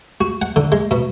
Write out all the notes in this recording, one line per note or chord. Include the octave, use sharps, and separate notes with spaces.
F#4
F#5
D3
G#3
B2